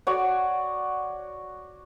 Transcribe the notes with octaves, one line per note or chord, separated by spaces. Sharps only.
F#4 C#5 D5